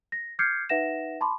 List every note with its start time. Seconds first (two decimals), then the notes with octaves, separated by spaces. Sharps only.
0.12 A#6
0.39 D6 F6 G6 G#6 C7 C#7
0.69 D#4 B4 E5 F#5 A#6 E7
1.21 A5 B5 C6 D6